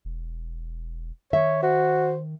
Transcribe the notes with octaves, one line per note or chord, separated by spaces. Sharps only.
E1
D#3 C#5 E5
F#4 C5